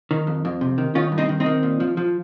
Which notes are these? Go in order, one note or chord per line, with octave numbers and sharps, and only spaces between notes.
D#3
F2
F2
C3
D#3
D#3 C#4 F4
G2
C4 D#4
D#3
C4 D#4
D#3
A#2
F3
F3